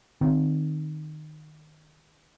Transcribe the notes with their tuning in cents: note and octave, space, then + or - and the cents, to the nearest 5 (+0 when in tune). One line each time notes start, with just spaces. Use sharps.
D#3 -20 C4 -5